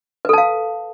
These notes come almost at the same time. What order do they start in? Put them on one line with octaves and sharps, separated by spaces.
B4 A4 A5 F5